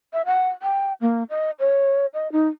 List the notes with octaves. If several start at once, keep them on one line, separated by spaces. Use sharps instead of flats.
E5
F#5
G5
A#3
D#5
C#5
D#5
D#4